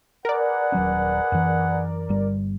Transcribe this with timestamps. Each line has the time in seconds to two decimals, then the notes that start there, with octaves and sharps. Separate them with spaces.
0.25 G#4 A#4 B4 D5 F#5
0.72 D#1 F#3 C#4
1.32 F#2 E3
2.09 G1 G2 G3